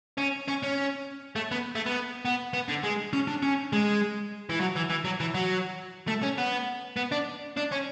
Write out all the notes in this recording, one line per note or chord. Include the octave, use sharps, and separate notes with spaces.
C#4
C#4
C#4
A3
B3
A3
B3
B3
B3
D3
G#3
C#4
D4
C#4
G#3
E3
F#3
E3
E3
F#3
E3
F#3
A3
C#4
B3
B3
D4
D4
C#4